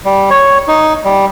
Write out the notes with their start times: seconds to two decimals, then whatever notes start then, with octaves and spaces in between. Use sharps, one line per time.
0.05 G3
0.30 C#5
0.68 D#4
1.04 G3